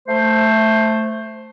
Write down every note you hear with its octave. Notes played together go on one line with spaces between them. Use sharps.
A3 C5